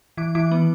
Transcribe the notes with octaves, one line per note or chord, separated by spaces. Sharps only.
E3 D6
E3 D6
B3